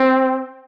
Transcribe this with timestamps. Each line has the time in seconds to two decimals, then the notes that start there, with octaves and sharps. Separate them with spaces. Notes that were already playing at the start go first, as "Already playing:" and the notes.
Already playing: C4